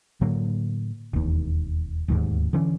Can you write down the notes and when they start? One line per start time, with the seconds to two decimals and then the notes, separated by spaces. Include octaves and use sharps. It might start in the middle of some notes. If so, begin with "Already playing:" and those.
0.21 A2 D3 F#3 A#3
1.13 E1 D#2
2.08 D1 D#2 G#2
2.53 D3 E3 C#4